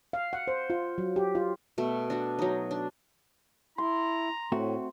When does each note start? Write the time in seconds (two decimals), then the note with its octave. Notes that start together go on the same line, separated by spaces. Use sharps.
0.13 F5
0.33 F#5
0.48 C5
0.70 F4
0.98 F#3
1.16 G4
1.35 F4
1.78 B2 A3
2.10 D4 F#4
2.39 F#3 D#4
2.71 D4
3.78 E4 A#5 C6
4.52 A2 A3 C4 F#4